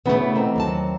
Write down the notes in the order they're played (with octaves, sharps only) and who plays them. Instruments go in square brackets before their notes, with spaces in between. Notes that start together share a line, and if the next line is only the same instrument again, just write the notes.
[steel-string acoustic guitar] D2 C#3 B3 [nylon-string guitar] E3 A3
[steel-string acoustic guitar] D#3 A#3 C4
[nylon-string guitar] D#2 F#3 A5